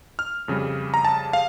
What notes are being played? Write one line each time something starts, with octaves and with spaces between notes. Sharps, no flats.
F6
F2 C#3 G3
A#5
A5
F5